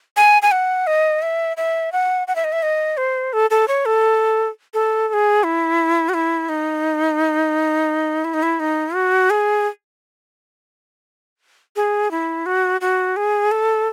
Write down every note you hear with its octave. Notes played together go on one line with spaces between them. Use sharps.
G#5
G#5
F#5
D#5
E5
E5
F#5
F#5
E5
D#5
E5
D#5
C5
A4
A4
C#5
A4
A4
A4
G#4
E4
F#4
E4
D#4
E4
D#4
E4
D#4
F#4
G#4
G#4
E4
F#4
F#4
G#4
A4